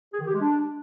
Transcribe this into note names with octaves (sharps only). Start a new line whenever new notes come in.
G#4
D#3
G4
G#3
D4